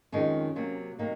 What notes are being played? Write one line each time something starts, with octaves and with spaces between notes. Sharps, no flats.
F2 D#3 G#3 C#4
C3 F#3 A#3
C3 F#3 A#3 D#4